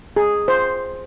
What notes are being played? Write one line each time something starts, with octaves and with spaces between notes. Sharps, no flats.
G#4
C5